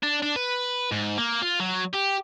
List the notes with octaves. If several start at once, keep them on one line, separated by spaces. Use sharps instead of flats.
D4
D4
B4
G#2
A#3
F4
F#3
G4